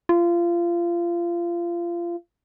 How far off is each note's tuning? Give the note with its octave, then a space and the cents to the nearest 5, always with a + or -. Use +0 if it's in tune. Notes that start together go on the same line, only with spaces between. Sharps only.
F4 -25